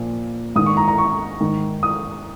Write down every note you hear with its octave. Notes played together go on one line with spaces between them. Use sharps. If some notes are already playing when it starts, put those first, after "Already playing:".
Already playing: A#2 F3
G#2 D#3 D#6
C#6
A#5
A#5
C#6
G#2 D#3
D#6